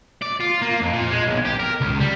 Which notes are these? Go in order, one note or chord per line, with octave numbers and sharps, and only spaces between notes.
D5
F4
A#3
F2
A#2
G#3
B1
G4
A#4
C#2
G3